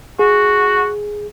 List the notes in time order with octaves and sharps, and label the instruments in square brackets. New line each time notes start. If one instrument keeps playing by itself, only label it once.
[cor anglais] F#4 [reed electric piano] G#4